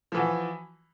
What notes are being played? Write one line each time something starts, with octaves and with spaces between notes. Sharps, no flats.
E3 F3 F#4